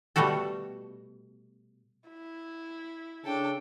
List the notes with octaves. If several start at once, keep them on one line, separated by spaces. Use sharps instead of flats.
B2 G3 A3 F#4 A4
E4
C#3 D4 A4 G5